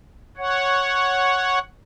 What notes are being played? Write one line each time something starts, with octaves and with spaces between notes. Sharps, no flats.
C#5 F#5